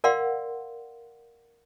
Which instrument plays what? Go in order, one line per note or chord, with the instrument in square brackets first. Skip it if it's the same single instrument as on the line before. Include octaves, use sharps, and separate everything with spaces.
[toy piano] A#4 D5 F5 F#5 C6